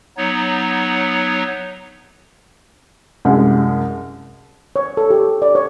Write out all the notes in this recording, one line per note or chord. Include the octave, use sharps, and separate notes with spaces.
F#3 B3 D#4 C#5
C2 F#2 G#3
C#5
A4
G4
D5
C#5